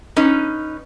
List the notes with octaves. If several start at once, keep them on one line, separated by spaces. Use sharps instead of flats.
C#4 D#4 B4